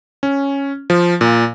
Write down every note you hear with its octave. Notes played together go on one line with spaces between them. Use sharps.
C#4
F3
A#2